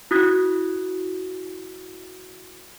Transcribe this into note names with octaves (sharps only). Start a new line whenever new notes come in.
E4 F#4 D#6 F#6 G#6 B6